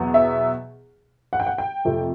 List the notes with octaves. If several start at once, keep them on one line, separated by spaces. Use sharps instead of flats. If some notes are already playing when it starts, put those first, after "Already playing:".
Already playing: E2 B2 F#3 B3
E5
F#5
G5
F#5
G5
F2 C3 F3 A3